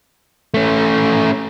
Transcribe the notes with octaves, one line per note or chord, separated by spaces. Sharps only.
A3 C#4